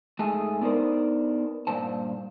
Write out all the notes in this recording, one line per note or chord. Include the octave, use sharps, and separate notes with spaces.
G#2 A3 G#4 A5
B3 D4 D#4 A#4 C5
G2 A#2 C5 A5